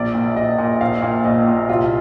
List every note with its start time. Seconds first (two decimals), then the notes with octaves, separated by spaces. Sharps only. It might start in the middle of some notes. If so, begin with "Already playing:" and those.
Already playing: A#1 D5
0.15 A#2
0.37 A#1 D#5
0.58 A#2
0.81 A#1 F5
1.02 A#2
1.24 A#1 D#5
1.47 A#2
1.69 C2 F4